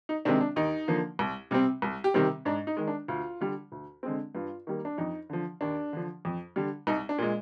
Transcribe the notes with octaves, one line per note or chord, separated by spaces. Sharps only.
D#4
C3 D#3 G#3 C4 D4
D4
D#2 D#4
D3 F3 A#3
C2
C3 G3 C4
C2
G4
C3 D#3 G3 C4
G#2 D4
D#4
D#3 G#3
D4
D2 F4
D3 G3
D2
D3 G#3 C4
G2 F4
D#3 G3 A#3
D4
F2 D#4
D3 F3
D#2 D4
D3 F3
F2
D3 G3
C2 D#4
D4
A#2 G#3